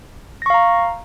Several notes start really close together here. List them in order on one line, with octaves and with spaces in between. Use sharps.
A#6 C#6 F5 A#5